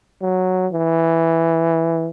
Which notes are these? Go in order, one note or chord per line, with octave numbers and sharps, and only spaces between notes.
F#3
E3